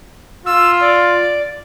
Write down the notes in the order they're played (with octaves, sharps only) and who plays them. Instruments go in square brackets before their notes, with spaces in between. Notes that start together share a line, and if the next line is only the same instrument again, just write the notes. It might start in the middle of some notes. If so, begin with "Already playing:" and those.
[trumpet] F4 [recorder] E6
[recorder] D5